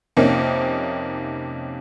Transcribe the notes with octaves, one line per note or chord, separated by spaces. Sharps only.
F2 C3 A#3 C#4 D#4